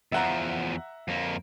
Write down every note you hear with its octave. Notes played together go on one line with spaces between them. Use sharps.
E2 F3 E5 F#5 A#5
F2 A#3